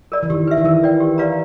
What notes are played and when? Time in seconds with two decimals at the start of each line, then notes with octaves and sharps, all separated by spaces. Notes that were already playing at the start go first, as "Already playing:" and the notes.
0.12 A#4 D5
0.23 E3
0.30 D#3 G4
0.47 B4 E5
0.57 D#3
0.65 E3 A#4
0.83 D5 G5
1.00 G4
1.18 B4 D5 F5 A#5